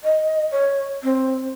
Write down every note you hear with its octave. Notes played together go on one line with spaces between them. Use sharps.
D#5
C#5
C4